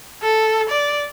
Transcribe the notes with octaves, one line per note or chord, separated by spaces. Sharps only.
A4
D5